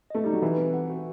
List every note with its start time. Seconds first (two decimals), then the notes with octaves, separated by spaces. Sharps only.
0.10 A3 D#5
0.24 G3 D#4
0.33 F#3
0.42 E3 B4
0.58 C4
0.74 F#5
0.90 F#4